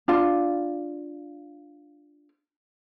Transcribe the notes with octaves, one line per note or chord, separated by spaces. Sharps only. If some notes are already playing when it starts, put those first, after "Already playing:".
D4 F4